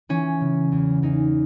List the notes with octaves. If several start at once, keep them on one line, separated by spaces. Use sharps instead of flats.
E3 C#4
C#3
E2
E2 D#4